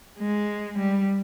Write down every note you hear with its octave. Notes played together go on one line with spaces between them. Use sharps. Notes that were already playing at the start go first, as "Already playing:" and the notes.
G#3
G3